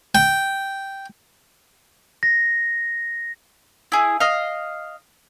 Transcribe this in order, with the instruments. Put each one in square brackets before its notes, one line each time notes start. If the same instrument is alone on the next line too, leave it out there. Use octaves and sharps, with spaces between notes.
[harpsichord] G5
[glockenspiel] A#6
[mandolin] E4 G#4
D#5 F5